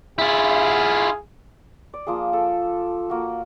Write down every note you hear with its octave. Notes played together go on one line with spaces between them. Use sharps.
E4 F4 G#4
D5
F3 A#3 G#4
A4
A#3 F#4